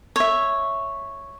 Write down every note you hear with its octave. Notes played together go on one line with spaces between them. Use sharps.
C#5 E5